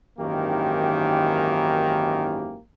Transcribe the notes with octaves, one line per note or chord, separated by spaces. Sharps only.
G#1 F#2 D#3 E3 A#3 G4